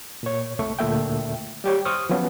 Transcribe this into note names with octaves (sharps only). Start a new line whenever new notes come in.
A#2 C#5
C2 A3 C#6
D2 A#2 A3 E5 G5
G3 G4 C#5
C5 C#6 D#6 F6
F3 F#3 B3 C#4